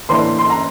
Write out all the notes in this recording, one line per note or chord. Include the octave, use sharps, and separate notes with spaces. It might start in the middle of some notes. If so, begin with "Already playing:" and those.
A2 E3 A#3 D4 C6
C6
A#5